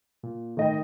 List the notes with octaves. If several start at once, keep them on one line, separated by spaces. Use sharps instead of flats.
A#2
A2 D#3 D#5 G5